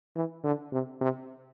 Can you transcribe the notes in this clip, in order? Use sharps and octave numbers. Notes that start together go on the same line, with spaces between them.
E3
D3
C3
C3